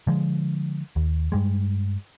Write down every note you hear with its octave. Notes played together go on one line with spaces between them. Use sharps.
D3 F3 G#3
D#2
G2 G3 G#3